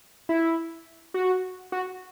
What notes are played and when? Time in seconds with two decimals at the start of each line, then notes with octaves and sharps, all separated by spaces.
0.29 E4
1.14 F#4
1.72 F#4